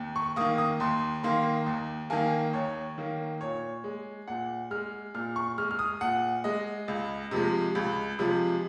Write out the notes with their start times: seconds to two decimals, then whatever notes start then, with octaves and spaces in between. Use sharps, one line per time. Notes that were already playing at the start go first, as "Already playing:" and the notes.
Already playing: D#2
0.16 C#6
0.36 D#3 A#3 D#6
0.58 D#6
0.80 D#2 C6
1.23 D#3 A#3 C6
1.66 D#2
2.10 D#3 A#3 G#5
2.53 D#2 C#5
2.98 D#3 A#3
3.41 A#2 C#5
3.84 G#3
4.28 A#2 F#5
4.71 G#3 F6
5.14 A#2 F6
5.36 C#6
5.58 G#3 F6
5.71 F6
5.79 D#6
6.01 A#2 F#5
6.44 G#3 D#5
6.88 C#2
7.31 C3 F3 G#3
7.75 C#2
8.19 C3 F3 G#3